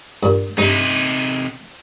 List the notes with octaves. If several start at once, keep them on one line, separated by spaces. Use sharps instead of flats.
G2 A#2
G2 C3 D#4